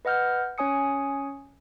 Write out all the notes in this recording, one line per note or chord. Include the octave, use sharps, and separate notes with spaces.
B4 D#5 F#5 F6 G6
C#4 C#5 G#5 D#6 C#7